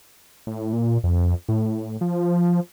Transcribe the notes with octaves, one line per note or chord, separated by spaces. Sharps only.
A2
A#2
F2
A2
F3